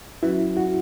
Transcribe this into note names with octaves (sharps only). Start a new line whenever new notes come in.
F#3 C#4 E4 F#4 B4
F#4